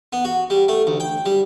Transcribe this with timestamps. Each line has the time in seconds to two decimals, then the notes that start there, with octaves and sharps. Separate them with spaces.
0.13 B3
0.25 F#4
0.50 G3
0.68 A3
0.87 D2
1.00 G5
1.26 G3